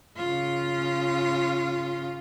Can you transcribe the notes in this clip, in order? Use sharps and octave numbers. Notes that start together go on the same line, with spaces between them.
C#3 F4